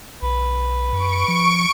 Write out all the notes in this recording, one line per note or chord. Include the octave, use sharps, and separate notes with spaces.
B1 B4
F#2 C#6 D7
F3